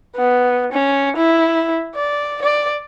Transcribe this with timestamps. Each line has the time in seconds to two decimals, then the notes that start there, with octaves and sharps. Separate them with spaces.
0.16 B3
0.72 C#4
1.17 E4
1.95 D5
2.42 D5